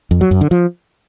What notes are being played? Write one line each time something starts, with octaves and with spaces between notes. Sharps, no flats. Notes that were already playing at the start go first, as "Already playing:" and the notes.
F2
F#3
F#2
D3
F3